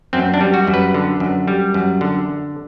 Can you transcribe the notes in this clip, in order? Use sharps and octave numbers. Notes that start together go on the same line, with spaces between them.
F#2 C4
D4
G3
F#4
F#2
B4
D3
F#2
G3
F#2
D3